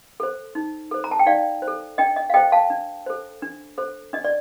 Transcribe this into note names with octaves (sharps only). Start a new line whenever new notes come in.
A4 C5
D#4
A4 C5
A#5
A5
G5
D#4 D5 F5
C5
A4
D4 D#5 G5
D#5
F5
A4 C5 D#5 G5
F5 A5
D4
A4 C5
D4
A4 C5
D4 D#5
D5